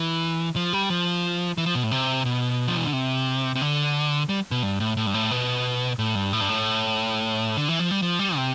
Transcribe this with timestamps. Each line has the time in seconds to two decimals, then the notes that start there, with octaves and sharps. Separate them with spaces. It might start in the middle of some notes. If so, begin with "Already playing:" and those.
Already playing: E3
0.56 F3
0.73 G3
0.90 F3
1.58 E3
1.66 F3
1.75 B2
1.83 A2
1.91 C3
2.25 B2
2.68 F3
2.77 E3
2.85 D3
2.93 C3
3.55 C3
3.61 D3
4.29 G3
4.51 B2
4.63 G2
4.80 A2
4.97 A2
5.07 G2
5.14 A2
5.31 B2
5.99 A2
6.15 G2
6.33 A2
6.41 G2
6.49 A2
7.57 D3
7.68 E3
7.79 F3
7.91 G3
8.02 F3
8.19 G3
8.36 C3